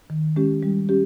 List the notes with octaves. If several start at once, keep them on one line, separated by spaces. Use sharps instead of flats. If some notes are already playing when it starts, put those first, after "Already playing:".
D#3
G#3 C#4 G4
G3
C#4 G4